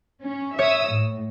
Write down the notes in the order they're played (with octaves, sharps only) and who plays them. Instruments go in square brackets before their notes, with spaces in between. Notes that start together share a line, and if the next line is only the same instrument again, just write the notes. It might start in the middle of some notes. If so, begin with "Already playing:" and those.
[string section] C#4
[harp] C#5 [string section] E5 D#6 E6
[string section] A2